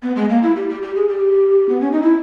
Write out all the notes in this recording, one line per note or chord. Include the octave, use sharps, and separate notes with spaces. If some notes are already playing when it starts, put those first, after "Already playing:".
B3
G#3
A#3
E4
G4
G4
G4
G#4
G4
B3
C#4
D#4
E4